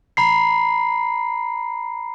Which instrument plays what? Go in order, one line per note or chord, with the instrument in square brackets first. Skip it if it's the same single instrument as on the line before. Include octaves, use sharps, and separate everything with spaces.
[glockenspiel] A#5 B5 C7